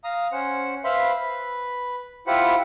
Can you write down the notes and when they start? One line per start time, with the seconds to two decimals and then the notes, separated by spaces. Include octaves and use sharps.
0.04 F5 A#5 D#6
0.32 C#4 C5 F#5
0.84 B4 C5 E5 F5 B5 C6
1.15 B4
2.27 E4 F4 G4 C5 F#5 B5